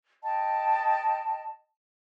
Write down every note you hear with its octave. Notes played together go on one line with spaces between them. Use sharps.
D#5 G5 A5